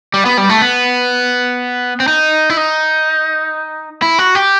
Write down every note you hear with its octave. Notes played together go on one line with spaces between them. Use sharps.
G3
B3
G3
A3
B3
C4
D#4
E4
D#4
E4
F#4
G4